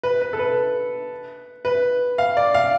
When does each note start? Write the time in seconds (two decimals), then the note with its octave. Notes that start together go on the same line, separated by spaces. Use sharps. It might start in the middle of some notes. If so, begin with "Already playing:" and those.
0.03 B4
0.22 B4
0.33 A4
0.39 B4
1.65 B4
2.18 F5
2.37 D5
2.54 F5